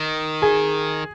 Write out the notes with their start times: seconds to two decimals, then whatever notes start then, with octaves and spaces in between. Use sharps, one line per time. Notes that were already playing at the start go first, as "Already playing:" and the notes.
Already playing: D#3
0.42 G#4